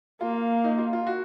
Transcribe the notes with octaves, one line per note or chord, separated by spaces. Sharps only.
A#3 F4
D#4
F4
F4
F#4